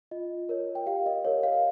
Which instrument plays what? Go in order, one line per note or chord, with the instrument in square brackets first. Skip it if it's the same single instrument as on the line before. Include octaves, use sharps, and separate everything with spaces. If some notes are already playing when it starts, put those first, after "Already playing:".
[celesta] F4 D#5
A#4 C#5
G5
G4 F5
D#5
A#4 C#5
F5